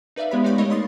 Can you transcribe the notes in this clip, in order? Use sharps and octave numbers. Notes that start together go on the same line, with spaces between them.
D#4 B4 D5 E5 F5
G#3 B3 G4 C#5 B5 B6
D#4 G4 D5 B5 C#6
A3 D#4 A#4 C#5 D#5 F5
B5 C6 D#6 A6 C7